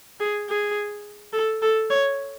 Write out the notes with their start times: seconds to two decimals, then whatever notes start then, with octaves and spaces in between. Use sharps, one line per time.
0.20 G#4
0.49 G#4
1.33 A4
1.62 A4
1.90 C#5